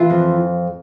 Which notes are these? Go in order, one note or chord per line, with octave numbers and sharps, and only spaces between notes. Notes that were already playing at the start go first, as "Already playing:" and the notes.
Already playing: E3 F4
F2